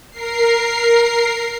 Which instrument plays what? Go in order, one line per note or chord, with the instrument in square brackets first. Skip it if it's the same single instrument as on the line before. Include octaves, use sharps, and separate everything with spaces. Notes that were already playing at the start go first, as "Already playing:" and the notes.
[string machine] A#4 C7